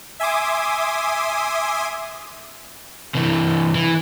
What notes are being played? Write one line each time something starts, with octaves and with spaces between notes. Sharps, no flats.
E5 G#5 C6 D6 D#6
C3 E3
E3